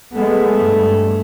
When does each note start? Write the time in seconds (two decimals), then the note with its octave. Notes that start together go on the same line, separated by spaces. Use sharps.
0.13 G#3 A3 B3
0.59 G2